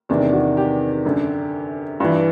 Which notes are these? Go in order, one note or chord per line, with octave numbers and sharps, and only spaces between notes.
E2 C3 D#3 D4
F#4
G4
F#2 D3
G2 E3